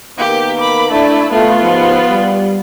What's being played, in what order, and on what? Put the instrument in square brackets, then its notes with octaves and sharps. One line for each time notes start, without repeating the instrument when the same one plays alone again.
[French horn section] D#3 A#3 B3 [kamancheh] G4
[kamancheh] B5 D6
[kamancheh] A3 E4 [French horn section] D4 D5
[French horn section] A3 [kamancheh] B3 F4
[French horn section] D#2 G#2 F3
G3